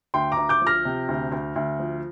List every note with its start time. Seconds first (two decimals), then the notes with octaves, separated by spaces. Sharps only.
0.14 D2 G5 C6
0.32 A#5 D6
0.37 D2
0.49 D6 G6
0.62 F3
0.67 F6 A#6
0.85 C3
1.08 D2
1.32 D2
1.56 D2
1.80 F3